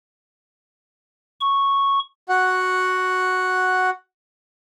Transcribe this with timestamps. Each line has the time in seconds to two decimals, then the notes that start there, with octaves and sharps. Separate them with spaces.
1.41 C#6
2.29 F#4 F#5